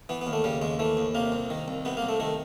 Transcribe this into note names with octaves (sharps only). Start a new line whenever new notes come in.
E3 B3
B3
D#2
A3
C#3 G3
D#2 G#3
E3 A3
D#2
C3 A#3
C2
D#3
C2
C3 B3
A#3
C2
A3
D#3 A3